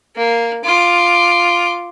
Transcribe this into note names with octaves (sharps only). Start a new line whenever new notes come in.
A#3
F4 D6